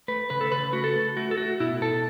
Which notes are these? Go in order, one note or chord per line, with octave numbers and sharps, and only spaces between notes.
A3 B4
C#3 B4
A4
C#3 B4
A3 F#4
A4
A3
A3 F#4
A4
A3 F#4
B2 E4
B2 A4